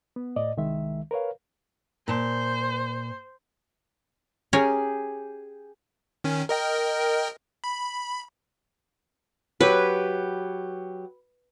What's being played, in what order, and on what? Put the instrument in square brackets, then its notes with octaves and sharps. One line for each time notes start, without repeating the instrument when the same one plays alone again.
[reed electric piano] B3
A2 D5 D#5
C2 D#3 G#3 E5
A#4 B4 C#5 F5
[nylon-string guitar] A#2 A5 [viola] C5
[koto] C#4 A#4 C#5 [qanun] G4 G#4
[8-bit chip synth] D#3 C#4
A#4 D#5 G5
B5
[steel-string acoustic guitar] F#3 G4 [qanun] B4